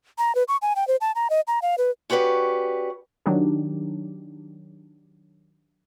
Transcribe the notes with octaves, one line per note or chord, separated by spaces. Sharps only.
A#5
B4
C#6
G#5
G5
C5
A5
A#5
D#5
A#5
F5
B4
C#4 F#4 G4 B4 D5
D#3 F#3 D4 D#4 G4